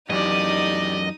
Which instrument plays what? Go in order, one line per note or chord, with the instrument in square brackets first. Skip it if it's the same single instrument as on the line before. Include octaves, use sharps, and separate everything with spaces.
[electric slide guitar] F#2 E3 [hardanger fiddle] D#4 D#6 [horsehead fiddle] G4 D5 [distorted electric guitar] D#5